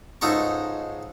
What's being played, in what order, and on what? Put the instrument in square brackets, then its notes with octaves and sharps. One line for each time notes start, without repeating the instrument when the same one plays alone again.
[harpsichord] C#2 G#2 D#4 A4 A#5 C#6